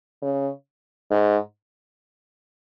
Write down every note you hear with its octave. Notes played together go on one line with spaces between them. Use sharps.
C#3
G#2